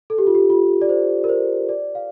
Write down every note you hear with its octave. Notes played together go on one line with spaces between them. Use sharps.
A4
G4
F4
G4
F4
D5
C5
A#4
C5
D5
F5